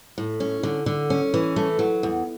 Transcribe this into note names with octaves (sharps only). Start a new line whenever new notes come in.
A2
C#4
D3
D3
C#4
E3
A3
F#3
E2